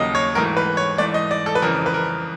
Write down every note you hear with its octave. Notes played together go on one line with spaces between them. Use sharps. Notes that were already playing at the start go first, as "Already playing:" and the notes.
Already playing: D#2 C#3 F#3 A#3 D#5
C#5
G#2 E3 A3 A#4
B4
C#5
G#2 E3 A3 D5
D#5
D5
A4
B4
F2 C#3 E3 A#4
B4
A#4